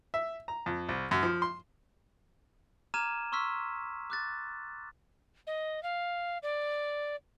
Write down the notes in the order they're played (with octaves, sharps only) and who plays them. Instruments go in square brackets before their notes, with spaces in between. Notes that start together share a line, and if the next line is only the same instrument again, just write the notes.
[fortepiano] E5
A#5
F2
C2
F#2
F3
C6
[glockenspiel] A#5 D6 F6 G#6 D#7 E7
C6 C#6 E6 F6 B6
D6 F#6 A6
[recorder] D#5
F5
D5